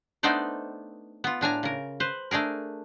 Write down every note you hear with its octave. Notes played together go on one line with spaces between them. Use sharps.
A3 B3 D4 D#4 C5 D5
B3 F4
A2 D4 G#5 A#5
C#3 A#4
B4 C5
A3 D4 G#4 A#4